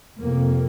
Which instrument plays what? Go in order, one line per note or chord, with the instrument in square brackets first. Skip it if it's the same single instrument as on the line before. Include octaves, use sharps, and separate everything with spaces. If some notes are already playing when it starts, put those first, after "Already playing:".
[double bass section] F2 C3 A#3